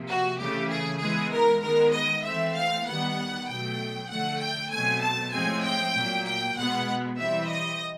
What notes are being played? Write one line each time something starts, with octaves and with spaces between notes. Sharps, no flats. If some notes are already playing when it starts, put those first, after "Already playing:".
Already playing: C3 F3 A#3
F#4
C#3 E3 A3 G4
G#4
E3 G#3 B3 G#4
A#4
D#3 G#3 B3 A#4
D#5
E3 A3 C4 E5
F5
D#3 G3 B3 F#5
B2 F#3 A3 G5
D3 F3 A3 F#5
G5
B2 F#3 A3 C4 G#5
A5
A2 F3 G#3 C4 G#5
G5
A#2 F#3 A#3
G5
B2 G#3 B3 F#5
E3 G3 C4 E5
D#5